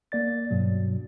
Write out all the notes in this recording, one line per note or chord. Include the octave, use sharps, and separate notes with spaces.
A#3 D5 A6
G2 B2 F#3